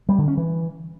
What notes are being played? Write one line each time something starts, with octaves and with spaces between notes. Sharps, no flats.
G3
D3
C#4
E3